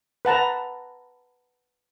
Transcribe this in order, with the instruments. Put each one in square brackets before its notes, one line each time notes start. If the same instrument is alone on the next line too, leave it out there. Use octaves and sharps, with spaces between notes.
[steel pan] B4 F#5 A5 A#5